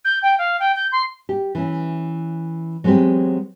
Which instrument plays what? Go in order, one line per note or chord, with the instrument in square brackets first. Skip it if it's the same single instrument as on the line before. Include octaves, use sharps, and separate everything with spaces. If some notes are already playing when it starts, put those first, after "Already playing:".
[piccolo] G6
G5
F5
G5
G6
C6
[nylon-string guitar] G4
E3 C#4
F#3 G#3 B3 C4 G4